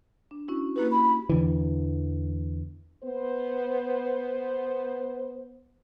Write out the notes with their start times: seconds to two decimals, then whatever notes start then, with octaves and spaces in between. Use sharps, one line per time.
0.31 D4
0.48 C#4 E4 F#4
0.76 A#3 E4 G4 B4
0.91 B5
1.30 E2 D3 E3
3.03 B3 C5